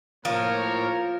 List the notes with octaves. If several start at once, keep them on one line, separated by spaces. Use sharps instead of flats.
A2 F3 A#3 A#4 C#5